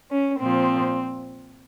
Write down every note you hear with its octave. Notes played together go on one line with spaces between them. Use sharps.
C#4
A#2 F3 C4